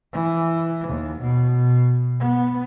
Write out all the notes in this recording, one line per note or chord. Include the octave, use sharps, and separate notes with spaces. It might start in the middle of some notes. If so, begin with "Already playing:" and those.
E3
D#2
B2
B3